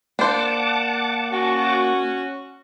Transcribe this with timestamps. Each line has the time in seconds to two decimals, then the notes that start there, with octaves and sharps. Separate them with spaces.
0.19 A#3 D4 C5 F#5 A5 D6
1.32 C#4 F#4